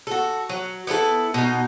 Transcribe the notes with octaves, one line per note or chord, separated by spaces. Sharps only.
F#4 A4
F#3
B3 E4 G4 A4
B2 D#4